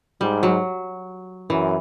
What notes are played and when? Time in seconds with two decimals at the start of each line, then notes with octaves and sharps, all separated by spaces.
0.21 G#2 G3
0.43 F#3
1.50 F#2 E3